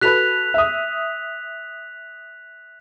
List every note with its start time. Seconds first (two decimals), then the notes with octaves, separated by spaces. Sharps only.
0.01 F#4 A4 B4 F#6 B6 F7
0.54 E5 D#6